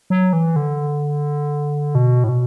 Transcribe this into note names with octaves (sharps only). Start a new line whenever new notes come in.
F#3
E3
D3
B2
A2
B2